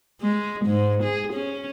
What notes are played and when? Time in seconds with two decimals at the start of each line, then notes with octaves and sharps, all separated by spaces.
0.21 G#3
0.66 G#2
1.03 G#4
1.33 C#4